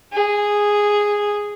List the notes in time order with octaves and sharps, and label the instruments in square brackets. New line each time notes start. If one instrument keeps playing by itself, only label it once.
[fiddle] G#4